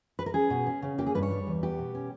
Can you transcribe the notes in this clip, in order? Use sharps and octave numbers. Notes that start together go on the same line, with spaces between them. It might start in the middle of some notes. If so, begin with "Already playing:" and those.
B4
A#4
C#4 G#4
B2
C#4
C#3
A#3 G4
G#4
G2 B4
C#5
G3
E2
B3 G4
B2
C#4